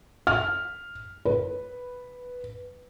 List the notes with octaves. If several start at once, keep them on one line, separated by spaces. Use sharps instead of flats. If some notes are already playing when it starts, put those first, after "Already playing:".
F6
B4